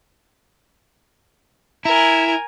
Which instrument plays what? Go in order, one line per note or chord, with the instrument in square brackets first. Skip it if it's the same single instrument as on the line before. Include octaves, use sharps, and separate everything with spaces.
[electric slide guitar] E4 [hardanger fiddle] A#4 G#5